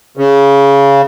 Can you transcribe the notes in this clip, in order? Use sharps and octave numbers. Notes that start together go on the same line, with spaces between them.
C#3